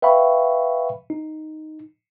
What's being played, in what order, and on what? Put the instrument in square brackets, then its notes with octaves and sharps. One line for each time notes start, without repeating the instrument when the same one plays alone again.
[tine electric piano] B4 E5 F5 G5 B5 C#6
D#4